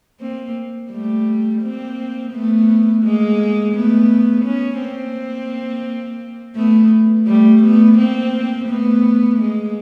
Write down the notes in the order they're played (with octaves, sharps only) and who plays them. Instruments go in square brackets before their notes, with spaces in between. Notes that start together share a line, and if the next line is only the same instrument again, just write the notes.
[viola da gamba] A#3 C4
G3 A3
A#3 C4
A3 B3
G#3 A#3
A3 B3
B3 C#4
A#3 C4
A3 B3
G3 A3
A3 B3
A#3 C4
A3 B3
G#3 A#3